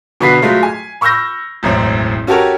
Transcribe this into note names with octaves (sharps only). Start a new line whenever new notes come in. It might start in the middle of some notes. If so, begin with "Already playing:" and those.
B2 D3 F#4 B4 B6 C7
F#3 G#3 A3 F4
G#5
B5 C#6 E6 F6 G6 A#6
E1 A1 F#2 A2 C4
C#4 F#4 G4 A4 A#4 C#5